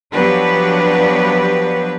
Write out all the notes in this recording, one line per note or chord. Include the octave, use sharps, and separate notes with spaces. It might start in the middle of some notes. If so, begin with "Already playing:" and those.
F3 F#3 B3 D4 G4 B4